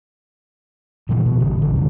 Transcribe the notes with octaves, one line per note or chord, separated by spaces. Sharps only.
A#2 C#3 E3 F3
B2
A1 D3
A1 D3
D#2 C3